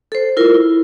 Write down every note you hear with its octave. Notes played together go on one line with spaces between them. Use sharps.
A4 C5
E4 F4 A#4
E4